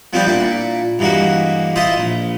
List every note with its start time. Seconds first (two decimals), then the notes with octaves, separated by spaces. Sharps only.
0.13 F3 G3 B3 C4 D4 G4
0.26 A#2 D4 E4
0.99 G2 E3 G#3 A#3 F#4
1.76 E4 F4 C5 D#5 E5
1.98 A#1